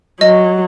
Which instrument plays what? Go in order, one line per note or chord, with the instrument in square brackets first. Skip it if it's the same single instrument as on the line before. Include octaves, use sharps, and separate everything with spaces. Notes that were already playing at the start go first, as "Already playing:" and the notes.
[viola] F#3 [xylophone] D#5